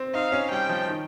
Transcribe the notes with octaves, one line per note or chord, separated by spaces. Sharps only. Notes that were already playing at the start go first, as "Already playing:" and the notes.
Already playing: C4
D#4 F5
C#4
G3 G5
F3
D#3